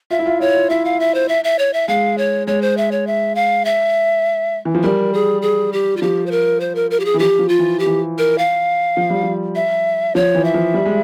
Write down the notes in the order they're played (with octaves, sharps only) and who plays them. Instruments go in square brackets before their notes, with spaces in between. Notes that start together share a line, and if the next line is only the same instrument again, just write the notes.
[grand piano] F4 [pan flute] E5
[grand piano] E4
F4
[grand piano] E4 [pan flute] C#5
[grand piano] F4
[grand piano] E4 [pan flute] E5
[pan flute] F5
E5
C5
E5
E5
C#5
E5
[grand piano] G#3 [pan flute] F5
[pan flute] C#5
[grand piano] G#3 [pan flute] C#5
[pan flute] C5
E5
C#5
E5
F5
E5
[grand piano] E3
F3
[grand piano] G3 [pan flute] A#4
[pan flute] G#4
G#4
G4
F4
[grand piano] F3 [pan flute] G4
[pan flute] C5
A#4
C5
A#4
A#4
G4
G#4
[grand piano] E3
[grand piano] F3 [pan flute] G4
[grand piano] F3
[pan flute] F4
[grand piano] E3
[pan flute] G4
[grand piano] E3
[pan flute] A#4
F5
[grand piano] F3
G3
F3
[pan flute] E5
[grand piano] F3 [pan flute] C#5
[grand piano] E3
[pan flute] E5
[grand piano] F3
G3
G#3